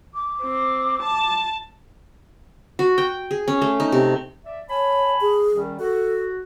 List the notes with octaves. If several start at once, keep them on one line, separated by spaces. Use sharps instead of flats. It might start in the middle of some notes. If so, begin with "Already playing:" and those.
D6
C4
A5
F#4
G5
G#4
C#4
A3
D#4
C3
D5 E5
C#5 G#5 A5 B5
G#4
F#2 D#3 G3
F#4 A4